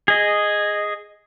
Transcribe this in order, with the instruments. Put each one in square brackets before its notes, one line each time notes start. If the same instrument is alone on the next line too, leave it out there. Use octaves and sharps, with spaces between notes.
[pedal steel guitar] G#4 D#5